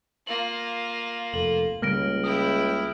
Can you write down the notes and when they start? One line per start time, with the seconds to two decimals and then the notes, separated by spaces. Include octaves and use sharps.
0.27 A#3 F4 F#7
1.34 F1 A4 F#7
1.82 C#2 C#3 G3 A#3 F6 A#6 D7
2.24 E4 G5 D#6